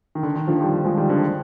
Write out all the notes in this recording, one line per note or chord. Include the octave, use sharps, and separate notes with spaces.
D#3
D3
D#3
D3 F3
D#3 G3
F3 G#3
D#3 G3
D3 F3